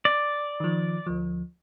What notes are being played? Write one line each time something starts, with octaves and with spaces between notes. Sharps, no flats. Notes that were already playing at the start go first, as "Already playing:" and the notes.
D5
D#3 F3
D2 F3